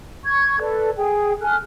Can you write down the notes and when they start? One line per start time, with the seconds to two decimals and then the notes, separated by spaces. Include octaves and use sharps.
0.23 C#6 G#6
0.59 A4 B4 D5
0.96 G#4 G5
1.41 A4 G#5 F6 F#6